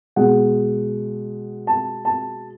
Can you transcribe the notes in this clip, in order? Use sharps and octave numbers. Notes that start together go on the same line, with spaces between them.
B2 G#3 F#5
A5
A5